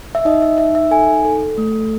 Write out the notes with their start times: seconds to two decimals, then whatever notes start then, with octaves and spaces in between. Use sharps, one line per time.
0.15 E5
0.25 D#4 D#5
0.42 E5
0.58 D#4 E5
0.75 E5
0.91 A4 G#5
1.25 A4
1.58 A3